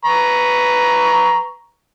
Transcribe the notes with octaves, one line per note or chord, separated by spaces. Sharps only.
B4 A#5 C#6